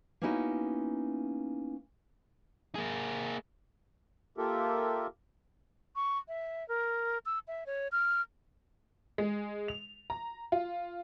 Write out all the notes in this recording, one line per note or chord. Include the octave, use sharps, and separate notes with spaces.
A#3 B3 C#4 D#4 E4 F#4
A#3 G#4
A#3 F4 G4 A4 A#4 E5
C#6
E5
A#4
E6
E5
C#5
F6
G#3
F7
A#5
F4